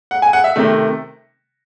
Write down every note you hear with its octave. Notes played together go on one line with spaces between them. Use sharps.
F#5
G#5
F#5
E5
C3 D#3 A3